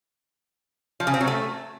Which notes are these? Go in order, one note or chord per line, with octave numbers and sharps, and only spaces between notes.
F3
C#3
C4
F#3
A3